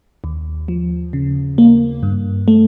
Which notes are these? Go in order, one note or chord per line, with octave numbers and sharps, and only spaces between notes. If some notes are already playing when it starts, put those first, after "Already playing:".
D#2
F3
C#3
A#3
G2
A3